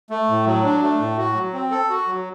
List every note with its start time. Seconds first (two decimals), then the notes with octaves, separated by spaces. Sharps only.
0.10 A3
0.28 A2
0.46 F#3
0.63 D4
0.82 A3
0.99 A2
1.17 F#4
1.36 F#3
1.53 C4
1.71 A4
1.89 F#4
2.07 F#3